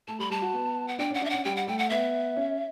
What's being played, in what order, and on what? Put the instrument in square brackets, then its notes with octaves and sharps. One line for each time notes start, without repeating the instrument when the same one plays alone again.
[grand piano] A3 [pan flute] A5
[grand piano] G3 [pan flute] B5
[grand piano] G3 [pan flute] A5
[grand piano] F#4
B3
[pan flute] F#5
[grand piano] D4 [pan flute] G5
[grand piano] C#4 [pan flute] F#5
[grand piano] D4 [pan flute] E5
[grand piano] C#4 [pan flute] F#5
[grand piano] G3 [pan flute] G5
[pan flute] F#5
[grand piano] A3 [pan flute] G5
[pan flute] F#5
[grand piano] B3 [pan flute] E5
[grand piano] C#4